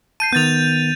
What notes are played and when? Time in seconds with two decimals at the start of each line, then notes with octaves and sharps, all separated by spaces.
0.20 A5 G6 C7 D#7
0.33 D#3 B3 G6 A6 F7